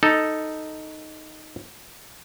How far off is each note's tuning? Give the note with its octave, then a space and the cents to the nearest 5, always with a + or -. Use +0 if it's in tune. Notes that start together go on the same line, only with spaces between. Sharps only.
D#4 +0 A4 +0